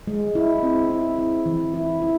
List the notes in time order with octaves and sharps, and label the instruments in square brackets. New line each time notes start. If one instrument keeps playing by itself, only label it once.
[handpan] G#3
E4
C4
E4
E4
E3
E4
E4